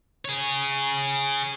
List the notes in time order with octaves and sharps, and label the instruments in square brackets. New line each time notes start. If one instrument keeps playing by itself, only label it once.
[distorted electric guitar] G#4 C#5